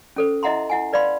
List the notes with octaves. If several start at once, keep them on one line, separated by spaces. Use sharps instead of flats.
C#4 A4 C5
E4 D#5 E5 F#5 A#5 C6
E4 F#5 G#5
B4 D5 F5 B5 C6